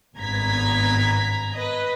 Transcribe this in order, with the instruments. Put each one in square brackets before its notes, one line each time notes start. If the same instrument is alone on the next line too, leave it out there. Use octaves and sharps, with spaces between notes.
[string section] G#1 G2 B3 A#5 G#6 B6
B4 D#5